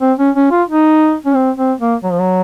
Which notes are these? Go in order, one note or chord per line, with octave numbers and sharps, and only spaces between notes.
C4
C#4
C#4
F4
D#4
C#4
C4
C4
A#3
F#3
F3
F#3